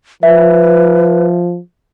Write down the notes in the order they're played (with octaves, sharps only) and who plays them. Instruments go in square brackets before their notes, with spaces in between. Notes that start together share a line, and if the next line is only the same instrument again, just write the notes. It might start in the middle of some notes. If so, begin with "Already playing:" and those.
[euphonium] F3 [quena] B4 [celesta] E5